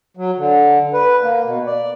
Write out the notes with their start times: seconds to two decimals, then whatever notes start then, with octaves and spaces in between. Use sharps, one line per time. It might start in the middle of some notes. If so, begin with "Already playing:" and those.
0.17 F#3
0.37 D3
0.94 B4
1.23 A#3
1.44 B2
1.67 D5